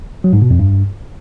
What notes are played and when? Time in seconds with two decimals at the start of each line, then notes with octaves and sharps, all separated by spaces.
0.24 F#3
0.33 G#2
0.42 B2
0.50 F2
0.59 G2